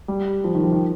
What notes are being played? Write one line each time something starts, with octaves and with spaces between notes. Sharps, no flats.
G3
F3
D#3
F3
D#3